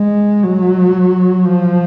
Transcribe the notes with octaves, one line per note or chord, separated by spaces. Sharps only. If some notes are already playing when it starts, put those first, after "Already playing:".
Already playing: G#3
F#3
F3